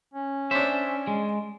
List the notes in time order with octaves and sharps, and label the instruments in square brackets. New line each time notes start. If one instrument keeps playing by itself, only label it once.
[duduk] C#4
[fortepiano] D4 C#5 [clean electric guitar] C5 E5
[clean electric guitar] G#3